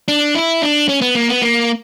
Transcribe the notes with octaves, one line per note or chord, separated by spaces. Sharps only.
D4
E4
D4
C#4
B3
A#3
B3
A#3